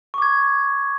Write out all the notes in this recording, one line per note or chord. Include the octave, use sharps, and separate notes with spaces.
C#6 D6 G#6